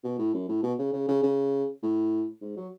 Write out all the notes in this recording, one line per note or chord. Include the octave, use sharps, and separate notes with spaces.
B2
A2
F#2
A2
B2
C#3
C#3
C#3
C#3
A2
G#2
F#3